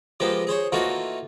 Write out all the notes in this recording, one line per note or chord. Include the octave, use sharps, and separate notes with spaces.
F3 G#3 A#3 B3 G4
G#4 C5 C#5
E3 A3 A#3 D#4 F4 F#4